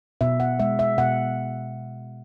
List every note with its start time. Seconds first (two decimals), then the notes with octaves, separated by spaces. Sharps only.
0.21 B2 E5
0.40 F#5
0.60 G#3 E5
0.79 E5
0.98 B2 F#5